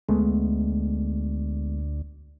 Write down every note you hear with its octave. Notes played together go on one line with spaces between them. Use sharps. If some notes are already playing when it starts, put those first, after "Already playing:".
D2 G#3 A3 B3